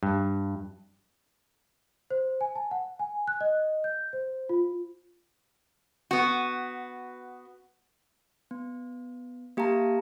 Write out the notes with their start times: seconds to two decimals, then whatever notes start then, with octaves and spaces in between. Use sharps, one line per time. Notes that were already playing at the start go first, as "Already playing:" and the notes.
0.03 G2
2.10 C5
2.41 G#5
2.56 A5
2.71 F#5
2.99 G#5
3.28 F#6
3.41 D#5
3.84 G6
4.13 C5
4.49 F4
6.11 B3 F#4
8.51 B3
9.57 A#3 G4 F5 A5 A#5